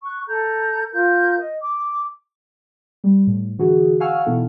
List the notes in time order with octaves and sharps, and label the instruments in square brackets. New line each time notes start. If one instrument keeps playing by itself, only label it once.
[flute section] C#6 F#6
A4 A#5 G6
F4 A#4 G6
D#5
D6
[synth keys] G3
A2
D3 E3 F#4 G#4
F5 F#5 G#5 C#6 E6 F6
B2 E3 B3 D#4 E4 A4